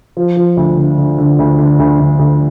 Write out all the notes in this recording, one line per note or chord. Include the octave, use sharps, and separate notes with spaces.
F3
F3
D2
D3
D3
D3
D2
D3
D2
D2
D2